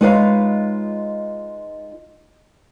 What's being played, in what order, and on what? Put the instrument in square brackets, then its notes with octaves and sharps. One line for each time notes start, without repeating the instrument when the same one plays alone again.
[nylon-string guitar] G#3 D#4 F4 B4 C#5 F5